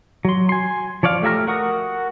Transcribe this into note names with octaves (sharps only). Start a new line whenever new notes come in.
F#3 C6
G#5 C6
F3 C#5 D5 F5
A3 G4 E5 A#5 F6
F#4 A#4 F#5 C#6 D#6